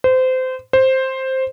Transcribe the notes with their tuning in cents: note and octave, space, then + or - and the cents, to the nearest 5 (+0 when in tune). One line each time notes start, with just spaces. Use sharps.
C5 -25
C5 +5